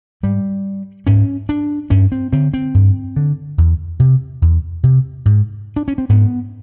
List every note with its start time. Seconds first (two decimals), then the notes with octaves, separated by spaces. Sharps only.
0.23 G#2 G3
1.07 G#2 C#4
1.49 D4
1.90 G2 C#4
2.12 C4
2.32 D3 C4
2.54 C4
2.74 G2
3.16 D3
3.58 E2
4.00 C3
4.42 E2
4.83 C3
5.25 G#2
5.76 D4
5.88 C#4
5.98 C4
6.09 G#2 B3